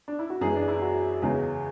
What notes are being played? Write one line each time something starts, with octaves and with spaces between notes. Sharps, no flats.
D4
E4
F#4
F#2 E3 G#3 G#4
D4
E4
F#4
E2 C#3 G#3